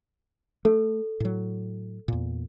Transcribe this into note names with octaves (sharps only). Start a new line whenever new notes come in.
A3 A4
A2 F#3
E2 A#2